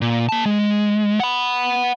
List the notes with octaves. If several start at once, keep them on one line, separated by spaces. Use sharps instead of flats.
A#2
A#3 A5
G#3
F#5 B5